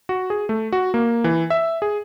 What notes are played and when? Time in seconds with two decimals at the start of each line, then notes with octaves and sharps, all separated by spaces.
0.09 F#4
0.30 G#4
0.49 A3
0.72 F#4
0.94 A#3
1.24 E3
1.50 E5
1.82 G#4